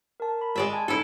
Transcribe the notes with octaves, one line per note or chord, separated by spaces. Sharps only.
A#4 A5
B5
G#3 D5 E5
G#5 A5 G#6
D#4 E4 A4 B5